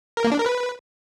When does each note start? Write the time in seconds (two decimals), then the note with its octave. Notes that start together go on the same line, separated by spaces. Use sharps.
0.17 A#4
0.24 A#3
0.32 D4
0.39 A#4
0.46 B4